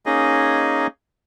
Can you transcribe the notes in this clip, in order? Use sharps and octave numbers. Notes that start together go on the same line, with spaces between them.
A#3 C#4 D#4 G#4 D#5